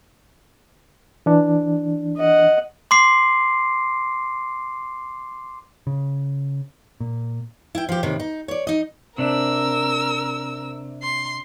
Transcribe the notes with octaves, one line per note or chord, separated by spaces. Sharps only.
E3 D4
D#5 F#5
C6 D6 C7
C#3
A#2
E4 G5
F3 G4
A2 C3 D#3
D#4
C#5 D5
D#4 D#5
C3 D4 A#4 E6
C6